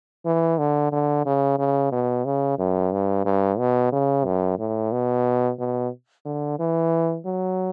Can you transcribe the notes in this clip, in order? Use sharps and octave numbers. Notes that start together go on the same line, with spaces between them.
E3
D3
D3
C#3
C#3
B2
C#3
F#2
G2
G2
B2
C#3
F#2
A2
B2
B2
D3
E3
F#3